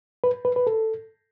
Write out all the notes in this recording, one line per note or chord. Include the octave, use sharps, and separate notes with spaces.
B4
B4
B4
A4